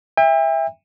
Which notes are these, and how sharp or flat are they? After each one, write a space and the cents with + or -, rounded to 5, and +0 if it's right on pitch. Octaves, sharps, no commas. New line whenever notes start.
E5 +0 G5 +40